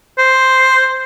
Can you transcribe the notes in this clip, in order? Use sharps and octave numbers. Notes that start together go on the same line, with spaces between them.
C5